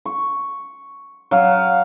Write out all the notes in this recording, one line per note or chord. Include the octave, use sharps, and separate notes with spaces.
C#6
F#3 F5